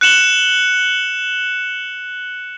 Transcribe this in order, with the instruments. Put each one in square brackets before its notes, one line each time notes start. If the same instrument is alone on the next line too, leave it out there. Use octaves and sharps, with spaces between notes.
[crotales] F#6 C#7 E7 F#7 G7